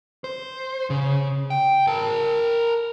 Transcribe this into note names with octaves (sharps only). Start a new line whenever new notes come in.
C5
C#3
G5
A#4 A5